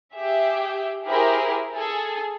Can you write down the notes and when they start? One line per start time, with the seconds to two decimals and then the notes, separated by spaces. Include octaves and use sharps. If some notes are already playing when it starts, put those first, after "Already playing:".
0.16 G4 G#4 E5
1.05 E4 G4 G#4 A#4 C5
1.74 G#4 A4 G#5